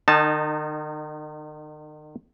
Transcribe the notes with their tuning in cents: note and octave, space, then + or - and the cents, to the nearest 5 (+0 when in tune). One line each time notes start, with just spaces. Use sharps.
D#3 -40 D#4 -15 A5 +0